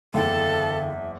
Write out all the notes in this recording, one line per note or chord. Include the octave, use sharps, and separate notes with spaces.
F#1 E2 D3 A4 E5 F5 G5